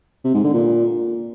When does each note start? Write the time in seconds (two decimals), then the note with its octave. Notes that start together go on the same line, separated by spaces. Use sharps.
0.24 C3
0.34 G#2
0.44 D3
0.54 A#2